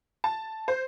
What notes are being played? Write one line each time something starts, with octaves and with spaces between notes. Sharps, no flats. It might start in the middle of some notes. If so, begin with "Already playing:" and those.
A5
C5